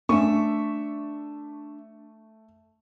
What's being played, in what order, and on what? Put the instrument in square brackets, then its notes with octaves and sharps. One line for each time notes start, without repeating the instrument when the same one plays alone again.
[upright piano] A3 C#6 [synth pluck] C#4 [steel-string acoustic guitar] D4 E5